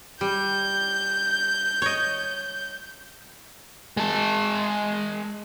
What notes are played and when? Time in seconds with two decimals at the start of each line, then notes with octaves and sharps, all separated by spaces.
0.21 G3 G6
1.82 C#5 D#5
3.97 G#3 A5